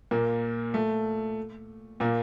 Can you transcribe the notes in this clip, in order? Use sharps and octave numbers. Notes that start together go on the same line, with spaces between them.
A#2 A#3
A3
A#2 A#3